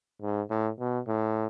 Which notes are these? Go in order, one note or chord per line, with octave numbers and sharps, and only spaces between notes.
G#2
A2
B2
A2